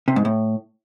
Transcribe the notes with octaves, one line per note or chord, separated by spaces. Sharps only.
C3
G#2
A2